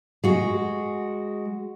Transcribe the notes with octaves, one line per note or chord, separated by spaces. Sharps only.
G#3 F#4